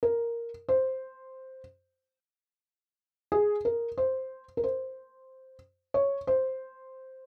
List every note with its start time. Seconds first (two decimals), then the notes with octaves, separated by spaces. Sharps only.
0.03 A#4
0.69 C5
3.32 G#4
3.65 A#4
3.98 C5
4.57 A#4
4.64 C5
5.94 C#5
6.27 C5